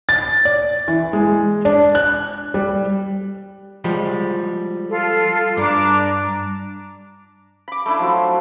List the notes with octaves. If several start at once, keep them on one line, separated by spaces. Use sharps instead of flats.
A6
D5
E3
G#3
D4
F#6
G3
F3 G3 G#3
F4 A4
G2 D4 A#5 D6
B5 D6
A3 D4 E4
F3 F#3